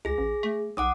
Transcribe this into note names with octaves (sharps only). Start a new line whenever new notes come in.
C#2 G#4 A#6
A1
A3
B1 F#5 D6 D#6